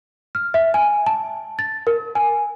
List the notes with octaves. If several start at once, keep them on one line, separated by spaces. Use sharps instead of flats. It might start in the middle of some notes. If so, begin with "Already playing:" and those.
F6
E5
G#5
A5
A6
A#4
G#5